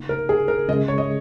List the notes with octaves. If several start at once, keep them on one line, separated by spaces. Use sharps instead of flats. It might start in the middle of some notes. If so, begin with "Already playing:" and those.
Already playing: C#3 A#3 D#4
A#4
G#4
A#4
C#3 G#3 C#4 G#4 D#5
C#5
D#5